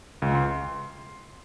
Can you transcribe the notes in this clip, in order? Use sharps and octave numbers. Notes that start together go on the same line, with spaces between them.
C#2
C6